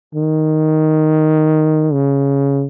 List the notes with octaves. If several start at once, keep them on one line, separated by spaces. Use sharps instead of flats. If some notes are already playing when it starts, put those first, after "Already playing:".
D#3
C#3